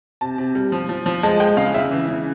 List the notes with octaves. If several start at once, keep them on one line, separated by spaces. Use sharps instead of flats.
C3 A5
C3
G3
F3
F3
F3
G#3 A5
G#3 G5
C#3 F5
C#3 E5
E3
C#3